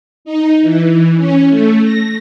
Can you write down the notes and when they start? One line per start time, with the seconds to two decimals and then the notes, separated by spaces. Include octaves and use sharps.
0.25 D#4
0.62 E3
1.17 C#4
1.50 A3
1.84 A#6